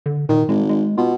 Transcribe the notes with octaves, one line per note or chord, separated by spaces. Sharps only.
D3
A#2 D#3
G#1 G#3
G#3
B2 F4